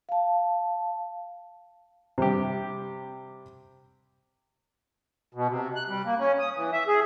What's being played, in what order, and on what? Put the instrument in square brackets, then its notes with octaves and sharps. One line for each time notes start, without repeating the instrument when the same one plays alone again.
[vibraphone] F5 A5
[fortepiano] C3 G3 G4
[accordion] B2
C3
F#6
G3
A#3
C#4
D#6
E3
E5
G#4